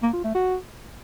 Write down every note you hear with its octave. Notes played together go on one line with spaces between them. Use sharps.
A#3
F4
A3
F#4